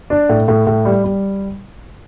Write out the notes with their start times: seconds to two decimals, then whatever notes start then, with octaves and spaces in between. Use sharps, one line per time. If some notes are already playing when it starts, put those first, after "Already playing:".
0.10 D4
0.29 A2
0.48 A2
0.67 A2
0.85 G3
1.04 G3